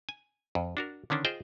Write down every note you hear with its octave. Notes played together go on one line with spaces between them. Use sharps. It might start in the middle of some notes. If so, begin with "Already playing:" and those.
G#5
F2
D4 F#4 A#4
D3 D#3 C#4 D4
F4 G#4 C5 D#5 G5